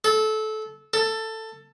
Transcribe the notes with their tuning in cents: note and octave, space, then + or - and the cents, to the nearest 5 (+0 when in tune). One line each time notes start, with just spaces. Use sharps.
A4 -20
A4 +15